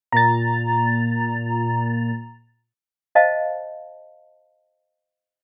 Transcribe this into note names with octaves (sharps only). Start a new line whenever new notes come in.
A#2 A#5 A6
C5 D#5 F5 A5